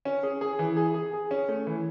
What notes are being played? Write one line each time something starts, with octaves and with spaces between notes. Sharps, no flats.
C#4
G#4
G#4
E3
G#4
G#4
G#4
C#4
A3
E3